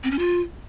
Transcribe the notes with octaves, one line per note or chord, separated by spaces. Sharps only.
C4
C#4
F4